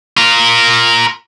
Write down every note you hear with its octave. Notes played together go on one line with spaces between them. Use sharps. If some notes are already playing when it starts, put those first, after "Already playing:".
F4 A#4